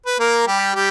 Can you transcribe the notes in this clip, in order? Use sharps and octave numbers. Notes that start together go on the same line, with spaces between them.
B4
A#3 A#4
G3 G4
G3 G4